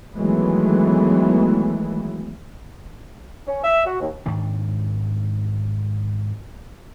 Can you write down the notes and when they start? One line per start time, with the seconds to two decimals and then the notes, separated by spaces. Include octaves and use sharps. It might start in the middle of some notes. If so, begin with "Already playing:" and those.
0.16 D#3 E3 F#3 G#3 A3 B3
3.48 C#4
3.64 E5
3.86 F#4
4.00 D#2
4.26 G#2 D#3 D4